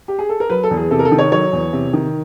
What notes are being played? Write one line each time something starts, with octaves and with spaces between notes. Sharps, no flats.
G4
G#4
A4
A#4
F#3 B4
A4
E2
G#4
C3 A4
A#4
A4
D#3
C#5
F#3 C#5
E2
C3
D#3